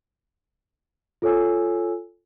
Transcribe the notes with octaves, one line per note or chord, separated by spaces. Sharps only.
F4 A4 C#5 G#5 E6